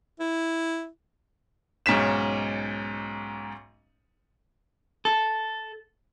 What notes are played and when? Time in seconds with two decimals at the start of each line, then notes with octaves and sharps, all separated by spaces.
0.20 E4
1.86 B1 G#2 C#4 B6 E7
5.05 A4